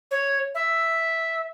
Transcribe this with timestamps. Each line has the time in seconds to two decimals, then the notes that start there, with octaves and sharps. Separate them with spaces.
0.11 C#5
0.55 E5